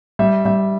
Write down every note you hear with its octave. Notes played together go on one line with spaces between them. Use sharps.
G3 E5
G3 E5